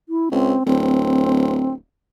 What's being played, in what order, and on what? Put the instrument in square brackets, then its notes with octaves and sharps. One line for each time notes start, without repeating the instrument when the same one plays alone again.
[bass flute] E4
[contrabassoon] C#2 [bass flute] C4
[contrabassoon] D1 [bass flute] C4